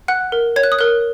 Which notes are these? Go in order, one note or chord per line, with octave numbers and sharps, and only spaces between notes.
F#5 F#6
A#4
C#5 G#6
F#6
D#6
A#4 F#6